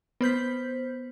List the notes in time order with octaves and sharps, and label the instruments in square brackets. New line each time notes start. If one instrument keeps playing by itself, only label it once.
[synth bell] B3 C5 G6 B6